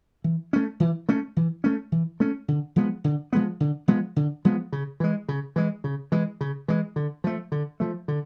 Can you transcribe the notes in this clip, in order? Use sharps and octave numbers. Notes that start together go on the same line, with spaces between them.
E3
A3 C#4
E3
A3 C#4
E3
A3 C#4
E3
A3 C#4
D3
F3 G#3 B3
D3
F3 G#3 B3
D3
F3 G#3 B3
D3
F3 G#3 B3
C#3
E3 G#3
C#3
E3 G#3
C#3
E3 G#3
C#3
E3 G#3
D3
F3 A3
D3
F3 A3
D3